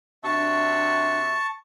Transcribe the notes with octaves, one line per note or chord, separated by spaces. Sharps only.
C3 D4 F#4 E5 A5 C#6